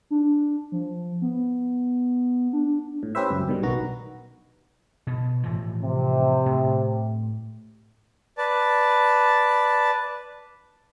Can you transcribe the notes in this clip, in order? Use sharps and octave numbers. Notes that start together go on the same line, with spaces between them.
D4
F3
B3
D4
A2
C#4 G4 B4 C5 E5
C#2 F#2
G2 B2 D#3 G3
B1 D#3 B3 F#4 A#5
B2
A2 E3 F3
C3
A2
B4 D5 A5